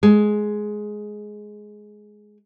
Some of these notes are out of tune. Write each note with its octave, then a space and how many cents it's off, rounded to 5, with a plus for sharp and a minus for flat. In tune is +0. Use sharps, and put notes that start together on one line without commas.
G#3 +10